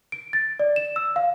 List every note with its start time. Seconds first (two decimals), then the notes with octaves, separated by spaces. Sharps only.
0.12 D7
0.33 A6
0.59 D5
0.76 E7
0.96 E6
1.16 F5